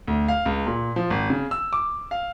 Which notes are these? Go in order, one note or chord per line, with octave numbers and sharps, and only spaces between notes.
D2
F5
C#2
A#2
F3
G#1
C#3
E6
D6
F5